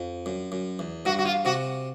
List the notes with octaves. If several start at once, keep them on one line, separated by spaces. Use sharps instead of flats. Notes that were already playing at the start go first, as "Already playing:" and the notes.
Already playing: F2
F#2
F#2
E2
G2 F#4
F#4
F4
C3 F#4